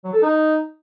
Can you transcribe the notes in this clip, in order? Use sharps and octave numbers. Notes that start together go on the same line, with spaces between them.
F#3
A4
D#4